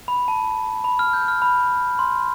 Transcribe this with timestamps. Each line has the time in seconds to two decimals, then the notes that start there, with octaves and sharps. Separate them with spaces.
0.08 B5
0.28 A5
0.84 B5
0.99 F6
1.13 G6
1.28 F6
1.42 B5
1.99 C6